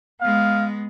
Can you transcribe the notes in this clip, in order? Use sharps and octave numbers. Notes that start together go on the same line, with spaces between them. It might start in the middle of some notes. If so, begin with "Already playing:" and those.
G#3 B3 F5